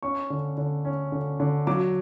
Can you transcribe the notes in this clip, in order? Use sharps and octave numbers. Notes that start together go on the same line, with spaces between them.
C#4 C#6
D3
D3
C#4
D3
D3
F#3 D6